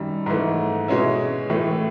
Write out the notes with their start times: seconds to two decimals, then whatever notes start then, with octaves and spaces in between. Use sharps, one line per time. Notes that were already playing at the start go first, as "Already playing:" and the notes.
Already playing: F#2 D#3 G3
0.26 G#2 E3 A3
0.88 B2 G#3 C#4 E4
1.50 A2 E3 A3